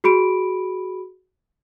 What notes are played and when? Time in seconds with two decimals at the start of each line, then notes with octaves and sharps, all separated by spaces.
0.04 F#4 G#4 B5 D7